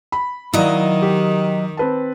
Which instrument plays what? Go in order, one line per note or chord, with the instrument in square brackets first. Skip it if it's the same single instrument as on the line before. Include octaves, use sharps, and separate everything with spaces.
[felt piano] B5
[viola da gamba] D#3 [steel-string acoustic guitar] F#3 D#5 [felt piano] E4 D5 F5
[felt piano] G4
C4 B4 A5